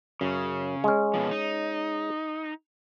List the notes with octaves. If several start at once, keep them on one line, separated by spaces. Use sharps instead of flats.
F#2 C#3
G#3 C#4
B2 F3
D#4